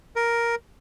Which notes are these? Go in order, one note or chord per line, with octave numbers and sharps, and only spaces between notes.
A#4